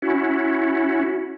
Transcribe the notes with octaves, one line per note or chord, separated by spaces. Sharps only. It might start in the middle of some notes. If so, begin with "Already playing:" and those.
C#4 E4 F#4